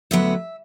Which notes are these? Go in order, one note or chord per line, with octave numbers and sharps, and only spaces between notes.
D2 D3 F#3 B3 E5